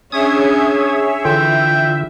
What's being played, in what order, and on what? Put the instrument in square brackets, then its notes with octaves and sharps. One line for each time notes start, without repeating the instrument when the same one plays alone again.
[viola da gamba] C#4 D4 [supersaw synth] G#4 C#5 E5 [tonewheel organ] D#6 G#6
[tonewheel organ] D3 F4 [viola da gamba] E3 [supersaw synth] E5 [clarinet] G5